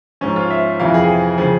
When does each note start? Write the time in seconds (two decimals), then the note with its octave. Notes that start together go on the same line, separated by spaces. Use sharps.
0.21 G#2 F3 C#4
0.36 F4
0.50 E5
0.79 F2 C3 E3 F5
0.94 G#4
1.38 C#3 F3 G#4